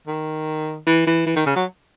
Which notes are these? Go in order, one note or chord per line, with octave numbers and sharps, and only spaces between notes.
D#3
E3
E3
E3
D#3
C#3
F#3